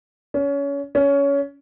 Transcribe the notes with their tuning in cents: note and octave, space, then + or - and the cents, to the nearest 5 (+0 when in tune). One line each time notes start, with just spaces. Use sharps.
C#4 +25
C#4 +20